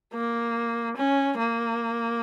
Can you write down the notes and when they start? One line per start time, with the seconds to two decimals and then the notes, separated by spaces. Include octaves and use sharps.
0.13 A#3
0.97 C#4
1.38 A#3